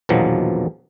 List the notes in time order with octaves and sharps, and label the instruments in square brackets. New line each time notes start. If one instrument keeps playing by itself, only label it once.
[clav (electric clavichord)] A#1 E2 B2 D#3 F3 F#3